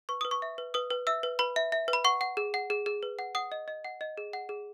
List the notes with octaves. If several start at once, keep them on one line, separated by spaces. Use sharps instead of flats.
B4 C#6
B4 D#6
C#6
E5
B4
B4 D#6
B4
E5 E6
B4
B4 B5
E5
E5
B4
B5
F#5 C#6
F#5
G#4
F#5
G#4
G#4
B4
F#5
F#5 D#6
D#5
D#5
F#5
D#5
G#4
F#5
G#4